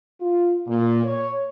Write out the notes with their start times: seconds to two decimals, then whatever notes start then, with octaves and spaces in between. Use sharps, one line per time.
0.20 F4
0.67 A#2
1.04 C#5